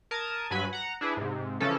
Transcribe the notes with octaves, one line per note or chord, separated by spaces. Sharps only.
A#4 A5 D#6 G#6
G2 F#3 B4 G#5 B5
F#5 A#5
D4 E4 G#4 B4
G#2 C3
C#3 E3 F3 C#4 A4